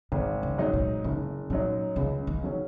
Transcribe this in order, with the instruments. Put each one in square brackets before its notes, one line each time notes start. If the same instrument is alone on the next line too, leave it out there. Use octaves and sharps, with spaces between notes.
[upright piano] G#1 [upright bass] D#3
[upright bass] C#3
[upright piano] G#2 F#3 D#4
[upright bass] A#2
[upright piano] F#1 [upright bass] C#3
[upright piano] F#2 F#3 D#4 [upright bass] A#2
[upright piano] C#2 [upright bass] C#3
[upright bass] D#3
[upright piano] C#3 F#3 C#4